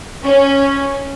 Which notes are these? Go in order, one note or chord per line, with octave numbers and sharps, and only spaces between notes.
C#4